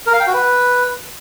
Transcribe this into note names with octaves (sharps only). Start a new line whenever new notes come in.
A#4
F5
G5
F#4
B4